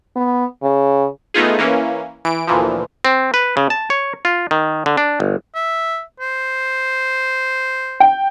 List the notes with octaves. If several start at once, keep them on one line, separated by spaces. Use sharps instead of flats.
B3
C#3
A3 B3 D#4 F4 G#4
E3 A#3 C#4
E3 D7
D2 A#2 E3 F3
C4
B4
C#3
A5
C#5
F4
D#3
D3
D4
G1
E5
C5
G5